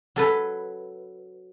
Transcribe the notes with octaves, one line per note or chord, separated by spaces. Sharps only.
F#3 A4 B4